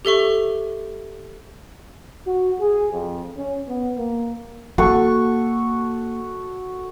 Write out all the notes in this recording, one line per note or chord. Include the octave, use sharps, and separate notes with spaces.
G4 A4 E5 C#6
F#4
G#4
F2
C#4
B3
A#3
A#3 F#4 A4 C#6